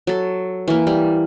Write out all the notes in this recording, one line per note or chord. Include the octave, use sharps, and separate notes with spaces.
F#3 A4
E3 A#3
G3